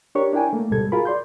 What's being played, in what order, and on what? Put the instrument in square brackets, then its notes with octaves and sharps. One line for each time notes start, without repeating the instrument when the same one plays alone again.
[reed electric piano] D4 G4 A#4 C#5 C#6
D4 E4 A#4 G5 G#5
A3 A#3
D2 G#2 B2 G3 A4 G#6
F4 F#4 G#4 A#4 B5
D5 C6 G6